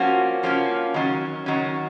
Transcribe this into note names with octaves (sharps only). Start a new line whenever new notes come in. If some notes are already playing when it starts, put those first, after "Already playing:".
Already playing: F3 A#3 C#4 F#4
F3 A#3 C#4
D#3 F#3 C#4
D#3 F#3 C#4